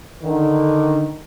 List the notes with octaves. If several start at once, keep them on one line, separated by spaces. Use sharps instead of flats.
D3 D#3